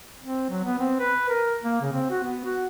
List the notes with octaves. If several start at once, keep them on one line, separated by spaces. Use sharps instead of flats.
C4
F#3
B3
C4
B4
A#4
A#3
C#3
C4
F#4
B3
F#4